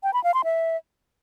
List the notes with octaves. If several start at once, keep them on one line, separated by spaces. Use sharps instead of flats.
G5
B5
F5
C6
E5